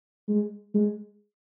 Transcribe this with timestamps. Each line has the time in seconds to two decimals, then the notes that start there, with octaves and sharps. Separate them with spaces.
0.29 G#3
0.75 G#3